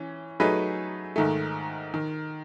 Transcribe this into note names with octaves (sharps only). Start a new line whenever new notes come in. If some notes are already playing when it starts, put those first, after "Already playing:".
Already playing: E3 C#4
F#3 A3 D#4 G#4 B4
G#2 D#3 A3
D#3